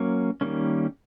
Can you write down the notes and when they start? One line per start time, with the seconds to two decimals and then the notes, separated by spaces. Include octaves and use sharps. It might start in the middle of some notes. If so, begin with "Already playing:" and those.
Already playing: F#3 A#3 C#4
0.41 D#3 G3 A#3 C#4